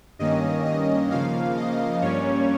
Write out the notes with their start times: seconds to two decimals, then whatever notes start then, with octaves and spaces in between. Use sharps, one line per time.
0.19 G2 D#3 A#3 C#4 D#5
0.65 D#5
1.11 C#3 F3 A#3 F5
1.57 D#5
2.02 G2 G3 A#3 C#4 C#5